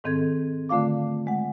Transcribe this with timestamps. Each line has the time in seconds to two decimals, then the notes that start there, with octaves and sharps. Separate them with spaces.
0.04 G#2 D#3 C4 A4 G#6
0.69 D3 A3 F4 F5 D6
1.27 G#3 F#5